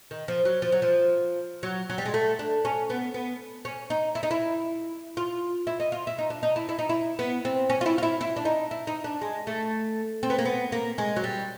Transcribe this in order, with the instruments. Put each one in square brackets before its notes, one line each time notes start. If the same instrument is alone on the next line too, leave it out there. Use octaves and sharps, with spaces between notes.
[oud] D#3
F3
F#3
F3
F#3
F3
F#3
F#3
G3
G#3
A3
D4
C#4
B3
B3
C#4
D#4
E4
D#4
E4
F4
E4
D#4
F4
E4
D#4
D4
D#4
E4
E4
D#4
E4
B3
C4
C#4
F4
E4
F4
E4
E4
D4
D#4
E4
D#4
D4
G#3
A3
C4
B3
A#3
B3
A#3
G#3
F#3
G3